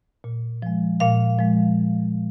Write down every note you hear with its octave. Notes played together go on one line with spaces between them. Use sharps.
A#2
F3 G#3
A#2 F5
F3 G#3